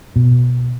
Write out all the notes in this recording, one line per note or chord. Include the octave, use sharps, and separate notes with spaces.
B2